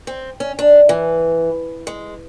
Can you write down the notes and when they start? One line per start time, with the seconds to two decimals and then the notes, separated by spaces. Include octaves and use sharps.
0.07 C4
0.40 C#4
0.59 D4
0.89 E3
1.87 G#3